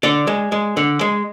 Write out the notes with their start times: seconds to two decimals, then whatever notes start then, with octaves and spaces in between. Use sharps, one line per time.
0.03 D3 D5
0.27 G#3
0.52 G#3
0.77 D3
1.01 G#3